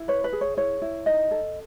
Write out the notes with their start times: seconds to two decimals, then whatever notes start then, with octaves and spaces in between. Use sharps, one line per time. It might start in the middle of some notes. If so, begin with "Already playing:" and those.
Already playing: E4
0.08 B4 C#5
0.24 B4
0.33 G#4
0.41 C#5
0.57 E4 C#5
0.82 E4
1.06 D#4 D#5
1.31 A4